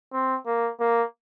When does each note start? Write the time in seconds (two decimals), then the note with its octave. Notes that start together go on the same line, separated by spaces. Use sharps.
0.12 C4
0.46 A#3
0.80 A#3